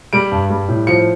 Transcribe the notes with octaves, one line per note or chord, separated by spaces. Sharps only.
G3 D7
G2
G3
A2
F3 C#7